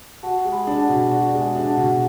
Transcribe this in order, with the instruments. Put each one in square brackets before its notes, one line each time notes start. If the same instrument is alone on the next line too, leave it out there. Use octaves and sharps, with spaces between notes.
[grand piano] F#4 [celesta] F#5 A5
[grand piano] G#3
[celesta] G#5 B5
[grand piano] D4
[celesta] F#5 A5
[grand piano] B2
[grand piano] F#4 [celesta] D5 F#5
[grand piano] G#3
[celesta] E5 G#5
[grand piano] D4
[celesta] F#5 A5
[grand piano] B2